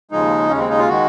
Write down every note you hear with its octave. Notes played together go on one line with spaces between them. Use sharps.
D#2 C#3 F3 G#3 D#4
D#2 C#3 G#3 C#4
C4
D#4
F4
D#3 G#3 F#4